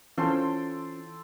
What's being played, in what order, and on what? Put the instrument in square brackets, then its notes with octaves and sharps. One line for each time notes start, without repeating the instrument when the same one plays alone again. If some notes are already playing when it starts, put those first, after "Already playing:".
[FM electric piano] E3 [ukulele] C#4 F4 C5 [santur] A4 G5 C6